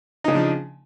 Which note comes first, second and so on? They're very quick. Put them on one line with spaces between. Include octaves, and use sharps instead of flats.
D#4 C#3 D4 F3